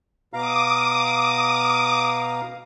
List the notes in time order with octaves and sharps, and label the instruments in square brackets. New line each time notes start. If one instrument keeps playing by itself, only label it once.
[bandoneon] B2 F5 A#5 [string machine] D6 D#6